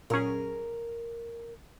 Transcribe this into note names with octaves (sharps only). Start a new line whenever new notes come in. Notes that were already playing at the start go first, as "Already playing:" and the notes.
A#2 F#3 C#4 G#4 A#4